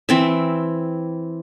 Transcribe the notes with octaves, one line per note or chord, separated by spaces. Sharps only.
E3 C4 E5